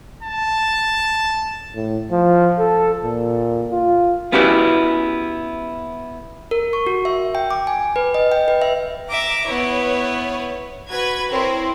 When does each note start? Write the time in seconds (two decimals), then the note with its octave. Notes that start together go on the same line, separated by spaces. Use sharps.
0.23 A5
1.75 A2
2.12 F3
2.59 A4
3.04 A#2
3.72 F4
4.32 B3 C#4 E4 F#4 G4 B4
6.51 A#4
6.73 C#6
6.87 F#4
7.05 E5
7.35 G5
7.51 D6
7.67 G#5
7.96 B4
8.14 D#5
8.32 G5
8.48 B4
8.62 E5
9.09 E5 A#5 D6
9.47 B3 E4 B4 C#5
10.89 F#4 B4 G#6
11.31 C4 E4 A#4 C#5